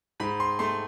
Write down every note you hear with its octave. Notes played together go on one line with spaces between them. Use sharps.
G#2 B5
C6
A3 C6